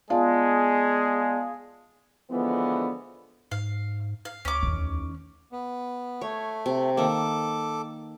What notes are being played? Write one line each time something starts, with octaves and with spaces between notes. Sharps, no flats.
G#3 B3 F4 G#4 D5 A5
D3 E3 F3 G#3 B3
G#2 F5
F5
D2 C#4 D6
E2 D#3
B3
A3 C#5
C3
D#3 A#3 A4 D6